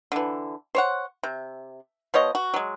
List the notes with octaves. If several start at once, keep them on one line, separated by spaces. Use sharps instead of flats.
D3 E3
C5 C#5 F#5
C3
F3 B3 C#5 D#5
F#4
F#3 G#3